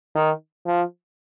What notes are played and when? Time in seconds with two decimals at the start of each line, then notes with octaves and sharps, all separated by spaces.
0.15 D#3
0.66 F3